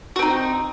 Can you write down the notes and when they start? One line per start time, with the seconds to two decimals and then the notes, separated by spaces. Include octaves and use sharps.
0.16 F#4
0.19 C4
0.22 D#4